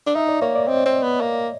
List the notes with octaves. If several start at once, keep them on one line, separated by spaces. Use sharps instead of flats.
D4
D#4 E5
D5
A#3 C#5
D5
C4 D#5
C4
B3
A#3